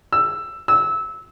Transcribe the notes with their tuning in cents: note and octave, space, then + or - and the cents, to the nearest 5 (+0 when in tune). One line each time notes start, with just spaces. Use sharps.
E6 +10
E6 -20